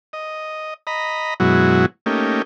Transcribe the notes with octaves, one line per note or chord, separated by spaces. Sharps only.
D#5
D#5 A#5 B5
F#2 B2 F#3 G#3 E4 F#4
A3 A#3 C#4 D#4 G4